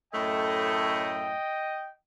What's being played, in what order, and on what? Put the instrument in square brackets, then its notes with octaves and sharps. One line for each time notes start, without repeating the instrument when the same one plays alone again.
[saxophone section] F#2 A2 A3 [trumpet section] D#5 G5